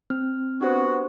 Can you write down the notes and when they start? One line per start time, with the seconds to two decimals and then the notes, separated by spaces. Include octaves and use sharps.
0.10 C4 F6
0.61 B3 D4 F#4 G4 C5